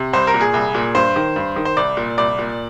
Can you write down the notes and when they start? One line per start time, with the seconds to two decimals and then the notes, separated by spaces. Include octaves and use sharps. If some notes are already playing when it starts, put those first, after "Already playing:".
Already playing: C3
0.13 C2 C5
0.27 A#4
0.34 A#2
0.41 G#4
0.54 C2
0.74 A#2
0.95 G2 C5
1.16 D#3
1.36 G2
1.56 D#3
1.65 C5
1.77 C2 D5
1.97 A#2
2.17 C2 D5
2.38 A#2